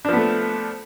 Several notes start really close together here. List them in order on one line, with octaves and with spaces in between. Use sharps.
D4 F3 B3 A3